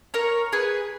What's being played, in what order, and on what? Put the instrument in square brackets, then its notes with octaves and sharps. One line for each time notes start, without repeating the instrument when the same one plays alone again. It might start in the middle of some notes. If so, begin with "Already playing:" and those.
[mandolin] A#4 C#5
G#4 B4